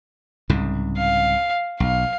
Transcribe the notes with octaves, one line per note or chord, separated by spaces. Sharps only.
C2 G#2 C#3
F5
B1 F5